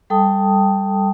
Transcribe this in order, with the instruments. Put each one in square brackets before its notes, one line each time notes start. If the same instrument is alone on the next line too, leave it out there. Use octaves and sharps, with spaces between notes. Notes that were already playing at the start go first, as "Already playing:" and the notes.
[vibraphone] G3 A4 G5 A5 D#6